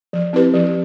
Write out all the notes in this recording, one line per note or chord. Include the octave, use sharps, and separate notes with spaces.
F3
C4 E4 G4 B4
F3